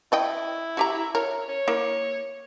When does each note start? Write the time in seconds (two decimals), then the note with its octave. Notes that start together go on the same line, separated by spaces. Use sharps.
0.12 E4 D5 D#5 G5
0.77 F#4 G4 A#5
1.15 A#4 C#5
1.48 C#5
1.68 A#3 E4